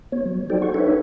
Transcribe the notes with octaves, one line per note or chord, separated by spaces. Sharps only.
B3 C#5
F#3
D#4 F#4 A4 C5 D5 G5
A4 F#5 C#6
D4 D#4 A4 B4 C#5 E5